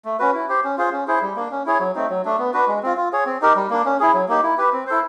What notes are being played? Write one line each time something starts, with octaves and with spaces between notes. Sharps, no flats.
A3
C#4 F#4 B4
E4
G4 C5
C#4
F4 G#4 C5
C#4
E4 G#4 C5
G3
A#3 D4
C#4
E4 G#4 C#5
F#3
A3 C4 D#4
F#3
A3 D4
B3
D4 F#4 B4
G#3
C4 F4
F4
G#4 C#5
C4
D#4 G4 A#4
G3
A#3 D4
C#4
E4 G#4
F#3
A#3 D#4 G4
E4
G4 B4
C4
E4 A4 C5